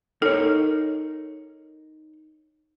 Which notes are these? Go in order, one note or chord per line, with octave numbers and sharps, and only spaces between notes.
D#4 A4 A#4 C#5